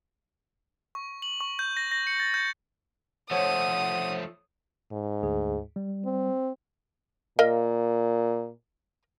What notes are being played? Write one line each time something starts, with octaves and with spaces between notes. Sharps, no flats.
C#6
F#7
C#6
G6
A#6
A#6
C#7
A6
G6
F3 A3 C5 C#5 F#5 D#6
G#2
D2 G#4
G3
C4
A#2 A#4 D#5 F5